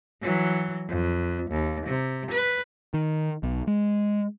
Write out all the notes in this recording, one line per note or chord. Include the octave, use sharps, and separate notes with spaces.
E3 F#3
F2
D#2
C3
B4
D#3
B1
G#3